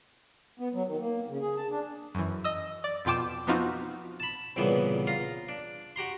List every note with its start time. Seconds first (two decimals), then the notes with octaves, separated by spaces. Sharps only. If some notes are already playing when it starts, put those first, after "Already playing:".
0.60 B3
0.74 F#3
0.88 D#3
1.00 A#3
1.29 C#3
1.41 G#4
1.57 A5
1.70 D4
2.15 F#2 E3
2.44 D#5 E6
2.84 D5
3.05 F2 B2 F4 G5 D6 E7
3.47 F3 B3 C4 D#4 F4 F#4
4.20 A5 B5
4.56 C2 G2 A#2 C#3 E3 B3
5.07 F4 F5 A#5
5.49 D4
5.96 F#4 G4 A#5 C6